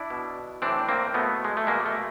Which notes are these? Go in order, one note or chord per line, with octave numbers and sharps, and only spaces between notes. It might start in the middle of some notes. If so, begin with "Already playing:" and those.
Already playing: D4 E4
B2
A2 E3 C4 D4
A#3 C4
B2 A3 B3
G#3
A3
B2 G#3 A#3
A3